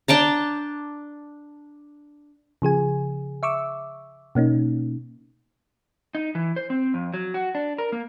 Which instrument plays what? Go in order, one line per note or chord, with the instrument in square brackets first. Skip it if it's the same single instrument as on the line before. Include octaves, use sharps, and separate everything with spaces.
[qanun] D4 G5 A5 A#5
[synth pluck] C#3 F3 G#4 G#5
E5 C#6 D6 E6
B2 A#3 C#4 D#4
[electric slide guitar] D#4
E3
C5
C4
F2
F#3
F#4
D4
A#4
A#3